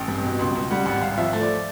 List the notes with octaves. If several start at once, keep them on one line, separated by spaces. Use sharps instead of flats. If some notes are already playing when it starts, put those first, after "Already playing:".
Already playing: A1 G5
G2
B2
C#2
C#2
G3 F#5
G#1 F#5
G#1 F5
F3 E5
A3
D5